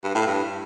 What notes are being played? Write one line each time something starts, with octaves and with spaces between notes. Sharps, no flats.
G2
A2
G2